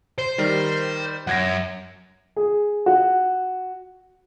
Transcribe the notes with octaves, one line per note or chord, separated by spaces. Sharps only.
C5
D#3 G3 A#4
F#2 F#5 G#6 A#6
G#4
F#4